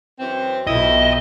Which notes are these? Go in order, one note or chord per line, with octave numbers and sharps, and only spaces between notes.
F#2 E3 C4
B1 F2 E3 E4 D#5